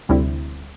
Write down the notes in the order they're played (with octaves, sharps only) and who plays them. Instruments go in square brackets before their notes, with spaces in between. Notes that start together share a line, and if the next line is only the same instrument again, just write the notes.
[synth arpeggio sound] D2 C3 G3 C4 E4